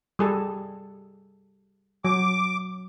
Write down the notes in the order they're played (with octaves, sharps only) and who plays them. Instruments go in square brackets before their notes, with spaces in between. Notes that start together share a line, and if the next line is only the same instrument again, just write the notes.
[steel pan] G3 G#4 A4
[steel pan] F#3 [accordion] D6